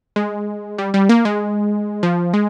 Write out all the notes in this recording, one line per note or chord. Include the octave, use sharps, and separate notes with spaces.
G#3
G3
G3
A#3
G#3
F3
G#3